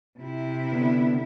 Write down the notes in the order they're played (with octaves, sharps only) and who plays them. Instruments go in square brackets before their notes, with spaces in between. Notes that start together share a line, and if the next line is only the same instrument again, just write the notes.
[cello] C3 E4
[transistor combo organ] D3 B3